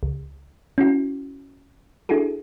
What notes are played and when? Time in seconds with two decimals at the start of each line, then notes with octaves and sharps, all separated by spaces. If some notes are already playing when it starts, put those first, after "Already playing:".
0.03 C#2
0.78 C#4 E4 F#4
2.09 D4 E4 F#4 G#4 A4